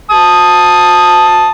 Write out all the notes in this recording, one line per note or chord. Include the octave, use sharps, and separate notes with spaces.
A5 D#6